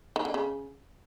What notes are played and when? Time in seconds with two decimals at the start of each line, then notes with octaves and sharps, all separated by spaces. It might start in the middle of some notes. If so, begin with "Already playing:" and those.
0.16 D#3
0.25 D3
0.34 C#3